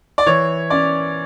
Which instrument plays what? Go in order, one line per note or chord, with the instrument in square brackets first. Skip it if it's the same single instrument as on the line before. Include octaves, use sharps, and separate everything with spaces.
[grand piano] D5
E3 C#5
C#4 D5